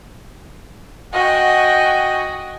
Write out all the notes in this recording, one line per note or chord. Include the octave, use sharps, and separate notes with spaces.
F#4 D#5 G5 G#5